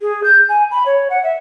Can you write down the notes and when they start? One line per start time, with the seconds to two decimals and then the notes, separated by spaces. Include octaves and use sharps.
0.01 G#4
0.24 G6
0.49 G#5
0.71 B5
0.86 C#5
1.10 F#5
1.24 E5